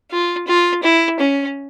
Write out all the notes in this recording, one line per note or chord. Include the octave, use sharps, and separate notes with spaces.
F4
F4
E4
C#4